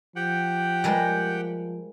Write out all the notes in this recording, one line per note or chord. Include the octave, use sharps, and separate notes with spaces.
F3 G4 F#5 G5
G3 G#3 A#4